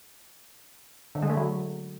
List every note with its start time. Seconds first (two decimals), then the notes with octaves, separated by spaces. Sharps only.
1.15 D3
1.22 G#3
1.30 A3
1.37 F#3